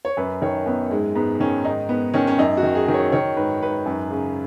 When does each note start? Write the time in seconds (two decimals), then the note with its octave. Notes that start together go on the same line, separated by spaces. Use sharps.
0.05 C#5
0.17 F#2 B4
0.42 D#3 C#5
0.66 F#2 B3
0.90 G#2 G#3
1.15 G#2 B3
1.40 D#3 C#4
1.65 G#2 D#4
1.89 G#2 B3
2.14 D#3 C#4
2.27 C#4
2.38 F#2 D#4
2.57 F#4
2.63 D#3
2.75 G#4
2.88 D#3
2.94 C#5
3.12 D#3 C#5
3.37 G#2 B4
3.62 G#2 B4
3.86 F#2
4.10 C#3